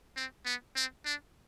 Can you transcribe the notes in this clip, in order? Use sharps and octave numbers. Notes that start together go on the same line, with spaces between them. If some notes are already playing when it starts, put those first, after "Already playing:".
C4
B3
C4
D4